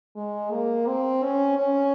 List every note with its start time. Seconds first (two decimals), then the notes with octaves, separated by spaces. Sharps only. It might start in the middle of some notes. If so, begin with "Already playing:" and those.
0.16 G#3
0.52 A#3
0.87 C4
1.24 C#4
1.58 C#4